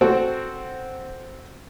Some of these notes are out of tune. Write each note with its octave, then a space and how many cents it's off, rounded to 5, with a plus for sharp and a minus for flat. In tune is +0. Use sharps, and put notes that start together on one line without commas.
C4 +0 F#4 +0 A4 +0